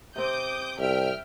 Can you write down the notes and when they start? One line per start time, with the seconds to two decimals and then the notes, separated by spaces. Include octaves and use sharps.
0.16 C3 C4 D6 D#6 G6
0.79 C2 E5 G5 F6